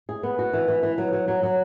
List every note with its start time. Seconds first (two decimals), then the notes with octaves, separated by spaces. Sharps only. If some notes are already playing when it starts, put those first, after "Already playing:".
0.09 G#4
0.23 B3
0.39 F#4
0.53 E3
0.68 E3
0.83 E3
0.98 F#3
1.13 F#3
1.28 F#3
1.43 F#3